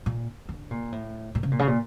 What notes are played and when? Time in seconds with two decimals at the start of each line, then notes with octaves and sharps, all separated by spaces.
0.06 A#2
0.49 D3
0.71 A#2
0.92 A2
1.35 A#2
1.43 C#3
1.52 A#2
1.59 C#3
1.68 A#2